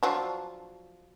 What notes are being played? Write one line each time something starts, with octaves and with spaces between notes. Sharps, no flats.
F3 F#3 D4